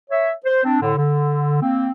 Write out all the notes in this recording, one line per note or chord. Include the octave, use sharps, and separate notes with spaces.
C#5 E5
C5
C4 D4
A2 D3
D3
A#3 C4